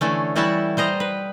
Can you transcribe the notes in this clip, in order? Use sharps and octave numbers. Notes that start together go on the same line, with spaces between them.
D3 E3 A3 C#4
E3 G3 E4 F#4 E5 A5
G3 C5 D#5 A#5
B4